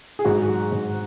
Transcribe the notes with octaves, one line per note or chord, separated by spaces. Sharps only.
G#4
G#2 F#4
F#3
G#2